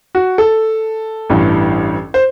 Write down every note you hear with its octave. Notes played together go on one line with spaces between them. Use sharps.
F#4
A4
A1 G2 E3
C5